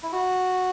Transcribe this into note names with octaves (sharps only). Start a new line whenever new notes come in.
E4
F#4